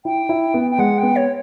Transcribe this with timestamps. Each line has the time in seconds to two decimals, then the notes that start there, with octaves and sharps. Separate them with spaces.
0.05 E4 G5
0.29 E4
0.54 B3
0.71 G5
0.78 G#3 F#5
0.98 G5
1.03 B3
1.15 C#5